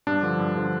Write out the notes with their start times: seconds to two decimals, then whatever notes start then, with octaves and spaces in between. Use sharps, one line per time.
0.07 G2 D4
0.23 D3 F3
0.39 G2
0.56 D3 F3